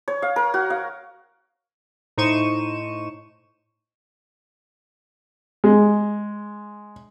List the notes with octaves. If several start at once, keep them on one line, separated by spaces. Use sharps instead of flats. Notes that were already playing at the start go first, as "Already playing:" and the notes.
C#5
F5
A#4
F#4
F5
A2 D#4 C5 C#6 D#7 E7
G#3